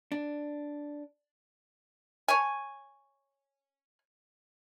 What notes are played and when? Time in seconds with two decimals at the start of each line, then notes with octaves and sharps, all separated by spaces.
0.12 D4
2.28 C#5 G#5